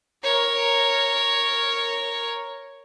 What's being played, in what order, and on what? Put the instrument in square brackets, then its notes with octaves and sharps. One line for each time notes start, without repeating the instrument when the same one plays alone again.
[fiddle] A#4 C#5